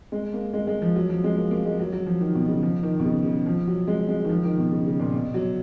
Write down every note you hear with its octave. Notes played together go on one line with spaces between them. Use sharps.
G#3
A#3
G#3
G#3
F3
F#3
F3
G#3
A#3
A#3
G#3
F#3
F#3
F3
D#3
B2
C#3
F3
D#3
B2
C#3
C#3
F3
F#3
G#3
G#3
D#3
F3
D#3
B2
C#3
C#3
A#2
B2
F#3